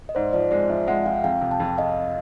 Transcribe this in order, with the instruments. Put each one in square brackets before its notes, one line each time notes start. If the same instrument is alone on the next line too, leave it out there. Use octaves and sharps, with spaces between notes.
[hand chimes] D#5
[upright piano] G#2 [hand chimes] C5 D5
[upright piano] F3 [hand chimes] C5 D5
[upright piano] G#3 [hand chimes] C5 D5
[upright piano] F3 [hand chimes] D5 E5
[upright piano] G#3 [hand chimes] E5 F#5
[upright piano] F3 [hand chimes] F5 G5
[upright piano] F2 [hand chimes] F5 G5
[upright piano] C3
[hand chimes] G5 A5
[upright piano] F2
[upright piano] F2 [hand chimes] D#5 F5